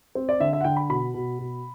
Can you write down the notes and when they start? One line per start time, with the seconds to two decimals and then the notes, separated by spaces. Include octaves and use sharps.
0.15 C4
0.29 D5
0.40 D3 E5
0.53 E5
0.61 F#5
0.64 D3 G5
0.77 B5
0.90 B2 B5
1.14 B2
1.39 B2